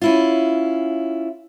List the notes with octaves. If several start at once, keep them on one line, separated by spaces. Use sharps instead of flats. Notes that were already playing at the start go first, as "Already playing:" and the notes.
C#4 E4 F4